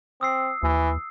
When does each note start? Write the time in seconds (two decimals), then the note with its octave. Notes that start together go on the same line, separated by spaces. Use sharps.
0.21 C4 D#6 E6 C7
0.63 D#2 E3